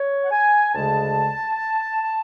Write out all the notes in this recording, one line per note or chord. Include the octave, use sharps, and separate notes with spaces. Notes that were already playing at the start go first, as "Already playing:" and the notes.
Already playing: C#5
F#5
G#5
D2 C#3 G#3 A5